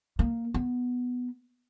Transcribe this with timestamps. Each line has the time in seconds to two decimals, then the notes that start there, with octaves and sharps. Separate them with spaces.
0.19 A#3
0.54 B3